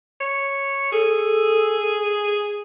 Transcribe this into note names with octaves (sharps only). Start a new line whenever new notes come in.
C#5
G#4 A4